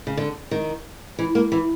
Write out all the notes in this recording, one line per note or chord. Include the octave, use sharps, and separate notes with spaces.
C#3
D3
D#3
E3
A#3
E3